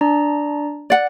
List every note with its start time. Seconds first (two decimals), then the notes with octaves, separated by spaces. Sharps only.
0.01 D4 D5 A#5
0.90 D5 F#5